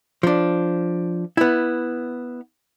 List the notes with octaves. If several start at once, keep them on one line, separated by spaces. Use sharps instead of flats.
F3 D4
B3 E4